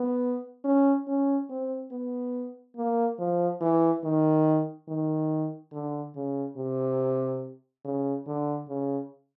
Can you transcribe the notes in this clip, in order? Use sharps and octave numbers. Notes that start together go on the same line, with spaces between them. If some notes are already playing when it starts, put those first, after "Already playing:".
Already playing: B3
C#4
C#4
C4
B3
A#3
F3
E3
D#3
D#3
D3
C#3
C3
C#3
D3
C#3